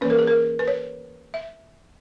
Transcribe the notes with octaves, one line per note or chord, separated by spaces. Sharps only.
E3 A#3 C#4 B4
A#4
G#4
A#4
B4
C#5
E5